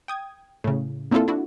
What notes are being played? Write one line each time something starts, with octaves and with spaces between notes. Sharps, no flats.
G5 D#6 G#6
A2 C#3
A#3 C4 D4 E4 F4 A4
D4 E4 F#4